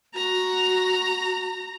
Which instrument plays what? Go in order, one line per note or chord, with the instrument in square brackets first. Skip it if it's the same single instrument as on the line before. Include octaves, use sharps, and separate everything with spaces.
[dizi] F#4 [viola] A#5